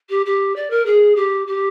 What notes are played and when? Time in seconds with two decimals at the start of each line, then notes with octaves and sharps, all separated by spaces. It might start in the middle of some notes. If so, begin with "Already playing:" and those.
0.09 G4
0.25 G4
0.55 D5
0.70 A#4
0.85 G#4
1.15 G4
1.46 G4